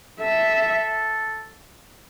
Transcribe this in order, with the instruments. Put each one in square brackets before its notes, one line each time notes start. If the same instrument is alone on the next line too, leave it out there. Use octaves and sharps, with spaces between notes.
[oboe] A4 [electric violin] E5